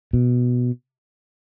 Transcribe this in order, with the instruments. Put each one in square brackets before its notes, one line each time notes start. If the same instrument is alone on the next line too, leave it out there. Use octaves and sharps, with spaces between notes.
[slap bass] B2